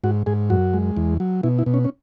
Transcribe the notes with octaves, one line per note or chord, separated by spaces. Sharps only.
G#2 F#4
G#2 G#4
F#2 F#4
G#3
E2
F#3
B2 E4
E4
B2
C#4
C#4